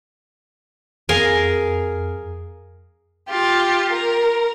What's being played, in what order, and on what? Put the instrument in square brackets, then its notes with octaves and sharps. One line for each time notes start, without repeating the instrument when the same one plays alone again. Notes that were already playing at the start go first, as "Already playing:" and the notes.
[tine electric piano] F2 [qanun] G#4 A#4 F5
[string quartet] F4 G4
A#4